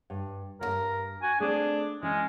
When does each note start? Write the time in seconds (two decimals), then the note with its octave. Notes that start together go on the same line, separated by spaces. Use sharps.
0.10 G2
0.61 D2 G2 A#4
1.22 F#4 G#5
1.40 A3 C4 D4 G#4
2.03 E3 G#3 C#4